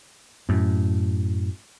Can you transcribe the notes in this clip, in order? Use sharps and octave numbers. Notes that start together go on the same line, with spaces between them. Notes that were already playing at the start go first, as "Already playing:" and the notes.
F#2 A2